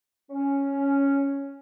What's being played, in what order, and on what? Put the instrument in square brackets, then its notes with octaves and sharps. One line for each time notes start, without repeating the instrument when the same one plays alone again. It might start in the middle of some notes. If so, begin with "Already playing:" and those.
[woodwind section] C#4